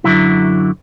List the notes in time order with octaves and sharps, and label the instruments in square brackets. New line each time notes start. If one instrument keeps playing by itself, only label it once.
[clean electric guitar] F#2 D3 E3 F#3 E4